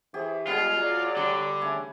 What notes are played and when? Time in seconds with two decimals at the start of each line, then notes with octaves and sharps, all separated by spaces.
0.14 E3 G4 G#4 C5
0.47 C#3 G3 G#3 B3 F4 G#4
0.77 F#3 D5
1.17 D3 G3
1.62 C#3 A3 C#4 G#5